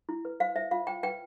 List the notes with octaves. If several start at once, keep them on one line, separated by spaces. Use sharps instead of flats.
E4
B4
C5 F5
C5 E5
F4 F5
C5 G5
B4 G5